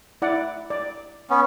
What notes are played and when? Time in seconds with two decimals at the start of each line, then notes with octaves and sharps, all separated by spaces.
0.22 E4 D5 F#5
0.70 D5
1.30 B3 C#4